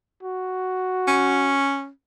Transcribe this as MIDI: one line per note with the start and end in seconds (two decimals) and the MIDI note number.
0.23 1.64 66
1.07 1.89 61